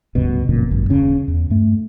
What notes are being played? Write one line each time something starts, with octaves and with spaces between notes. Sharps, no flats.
D1 C#2 G2 B2
F#1 F2 A#2 C#3
G#1 F#2
D#1 C#3 C#4
E2
G2 A3